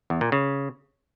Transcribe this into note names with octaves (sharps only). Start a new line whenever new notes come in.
E2
A#2
C#3